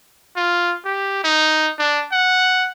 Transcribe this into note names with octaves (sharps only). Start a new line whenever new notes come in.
F4
G4
D#4
D4
F#5